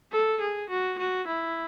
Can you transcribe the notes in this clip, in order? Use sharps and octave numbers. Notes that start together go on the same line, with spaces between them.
A4
G#4
F#4
F#4
E4